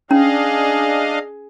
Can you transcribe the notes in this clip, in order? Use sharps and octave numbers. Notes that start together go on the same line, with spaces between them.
C#4 D4 G#4 D#5 F5